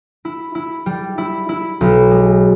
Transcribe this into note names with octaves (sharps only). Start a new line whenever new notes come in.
E4
E4
G3
E4
E4
B1
G#3